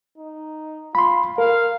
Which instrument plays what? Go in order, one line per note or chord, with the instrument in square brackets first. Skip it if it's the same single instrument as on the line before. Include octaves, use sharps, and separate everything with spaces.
[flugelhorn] D#4
[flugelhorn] F4 [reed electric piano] B5 C6
[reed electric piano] A#4 [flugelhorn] F5